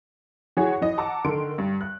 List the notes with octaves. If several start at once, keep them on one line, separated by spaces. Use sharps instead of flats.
E3 F#4 G#4 C#5
E3 D#5
F#5 A5 A#5 D6 E6
D3 D#3 C6 D7
G2
F#6